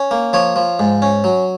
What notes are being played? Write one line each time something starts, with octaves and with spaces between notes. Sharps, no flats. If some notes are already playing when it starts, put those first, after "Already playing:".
Already playing: C#4
A#3
F3 C#5
F3
G#2
C#4
F#3